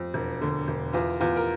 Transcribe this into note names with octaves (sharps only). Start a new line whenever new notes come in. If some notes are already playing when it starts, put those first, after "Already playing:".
Already playing: F2
E1
D3
E1
E2 F4
E2 F4
A#4